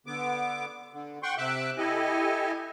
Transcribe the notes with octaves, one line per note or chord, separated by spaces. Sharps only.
D3 B3 D6
D3
F#5 G5 C6 C#6
C3 E5 D6 E6 F#6
E4 G4 A4 D#5 G#5